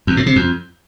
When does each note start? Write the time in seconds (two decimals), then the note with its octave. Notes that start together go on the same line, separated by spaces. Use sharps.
0.07 E2
0.17 A2
0.26 C3
0.36 F2